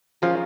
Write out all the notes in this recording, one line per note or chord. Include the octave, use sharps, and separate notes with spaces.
F3 G#3 C#4 F4 A#4